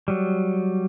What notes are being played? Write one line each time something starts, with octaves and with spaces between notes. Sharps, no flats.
F#3 G3